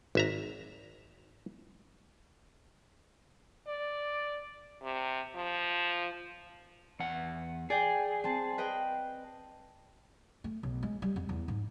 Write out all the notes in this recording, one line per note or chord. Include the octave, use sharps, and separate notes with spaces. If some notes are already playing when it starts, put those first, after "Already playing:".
G#1 E5 A#5
D5
C3
F3
E2 F#5
G#4 D5 G5
C4 A5
B4 D#5 G5
A3
B1
G#3
G3
F2
E2
G#2